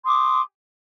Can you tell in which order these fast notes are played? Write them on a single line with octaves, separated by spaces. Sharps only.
C6 D#6 D6